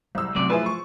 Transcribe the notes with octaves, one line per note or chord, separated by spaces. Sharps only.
C2 F#3 E6
F#2 C3 F#3 A3 D5
F3 E4 G#4 B4
C#6